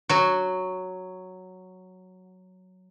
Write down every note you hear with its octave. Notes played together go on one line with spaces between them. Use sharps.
F#3 F#4